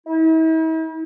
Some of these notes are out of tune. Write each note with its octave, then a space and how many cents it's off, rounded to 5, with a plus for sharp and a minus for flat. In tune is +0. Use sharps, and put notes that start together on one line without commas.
E4 -45